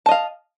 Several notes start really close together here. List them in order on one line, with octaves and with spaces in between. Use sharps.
A5 D#5 F5